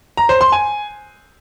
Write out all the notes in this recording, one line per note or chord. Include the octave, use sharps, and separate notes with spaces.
A#5
C5
C6
G#5